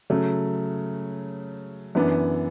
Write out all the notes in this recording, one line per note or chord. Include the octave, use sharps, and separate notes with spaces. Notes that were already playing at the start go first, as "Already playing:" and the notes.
C#3 F#3 A3
F#2 E3 B3 D4